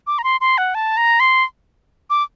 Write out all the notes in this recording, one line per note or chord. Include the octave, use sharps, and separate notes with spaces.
D6
A#5
C6
C6
F#5
A5
A#5
C6
D6